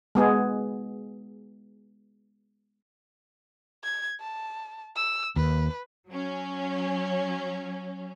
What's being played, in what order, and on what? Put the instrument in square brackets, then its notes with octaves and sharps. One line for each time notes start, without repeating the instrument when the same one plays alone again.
[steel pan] G#3 B3 G#4
[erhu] G#6
A5
E6
[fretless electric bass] D#2 [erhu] B4
[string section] F#3 C#4